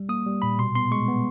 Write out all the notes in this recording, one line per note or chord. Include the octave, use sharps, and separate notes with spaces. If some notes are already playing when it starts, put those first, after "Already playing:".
Already playing: G3
A#3 D#6
G3
A#2 B5
B2 C6
B3 C6
G#3 C#6
B3